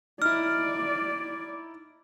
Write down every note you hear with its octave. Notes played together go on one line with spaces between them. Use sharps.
D#4 E4 D5 F6